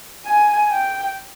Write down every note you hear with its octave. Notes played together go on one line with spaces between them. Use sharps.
G#5
G5